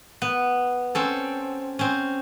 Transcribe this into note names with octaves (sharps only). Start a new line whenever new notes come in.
B3
C4 C#4 A4
C4 C#4